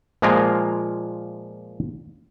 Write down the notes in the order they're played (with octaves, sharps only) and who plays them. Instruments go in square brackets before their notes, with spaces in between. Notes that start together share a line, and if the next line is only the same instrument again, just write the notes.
[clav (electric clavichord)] A#2 F3 G#3 A#3 F4 A#4